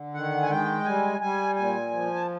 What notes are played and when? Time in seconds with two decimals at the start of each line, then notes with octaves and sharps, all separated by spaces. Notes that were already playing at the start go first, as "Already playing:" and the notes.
Already playing: D3
0.14 D#3 F#5
0.42 G#5
0.49 G#3 G5
0.85 G3 G#5
1.20 G3 G#5
1.55 A#2 G#5
1.91 F3
2.15 A5